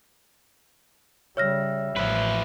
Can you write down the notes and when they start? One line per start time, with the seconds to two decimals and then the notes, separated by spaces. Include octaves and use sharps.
1.37 C#3 G3 C#5 E5 F6 A#6
1.96 A1 F3 B4 C5 E5